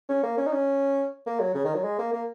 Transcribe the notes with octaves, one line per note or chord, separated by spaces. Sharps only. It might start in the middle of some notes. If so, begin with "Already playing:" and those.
C#4
A#3
C#4
D#4
C#4
A#3
F#3
C#3
D#3
F#3
G#3
A#3
A#3